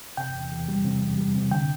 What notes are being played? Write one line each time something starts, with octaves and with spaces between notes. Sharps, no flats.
C3 G5
E2
E2
G3
C3
E2
G3
C3
D3 G5